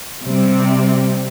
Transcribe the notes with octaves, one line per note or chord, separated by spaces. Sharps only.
C3 G3 C4